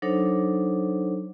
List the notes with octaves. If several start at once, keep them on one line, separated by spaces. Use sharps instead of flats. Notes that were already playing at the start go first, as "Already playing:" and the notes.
F#3 D4 D#4 A4 C5 C#5